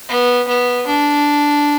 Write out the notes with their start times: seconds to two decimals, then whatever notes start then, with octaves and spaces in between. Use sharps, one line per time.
0.09 B3
0.47 B3
0.86 D4